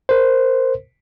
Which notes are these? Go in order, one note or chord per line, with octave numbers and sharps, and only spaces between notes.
A#4 C5